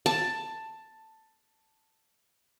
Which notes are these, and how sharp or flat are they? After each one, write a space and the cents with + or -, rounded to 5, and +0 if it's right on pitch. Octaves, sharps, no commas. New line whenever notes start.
A5 +10